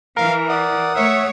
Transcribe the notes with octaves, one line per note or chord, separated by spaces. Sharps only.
E3 A#4 F5
D5 F#5 D#6
A3 C#5 E5